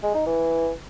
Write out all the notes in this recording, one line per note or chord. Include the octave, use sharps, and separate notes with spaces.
G#3
D#4
E3